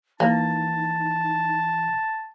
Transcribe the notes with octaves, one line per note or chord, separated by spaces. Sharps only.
E3 A#3 D#4 A5